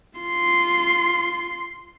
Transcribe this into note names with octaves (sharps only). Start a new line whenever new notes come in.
F4 C6